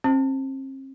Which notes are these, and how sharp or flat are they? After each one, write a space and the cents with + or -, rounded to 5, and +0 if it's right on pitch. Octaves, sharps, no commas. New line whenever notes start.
C4 +45 C5 +0